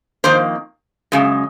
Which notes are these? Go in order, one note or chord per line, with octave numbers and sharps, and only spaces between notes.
F2 D#3 A#3 C5
F#2 C#3 G#3